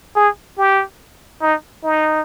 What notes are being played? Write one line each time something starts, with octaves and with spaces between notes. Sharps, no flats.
G#4
G4
D#4
D#4